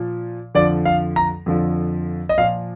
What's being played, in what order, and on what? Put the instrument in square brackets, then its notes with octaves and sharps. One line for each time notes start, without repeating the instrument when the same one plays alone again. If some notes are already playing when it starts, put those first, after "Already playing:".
Already playing: [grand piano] A#2 F3
F2 D3 F3 D5
F5
A#5
F2 D3 F3
D#5
A#2 F3 F5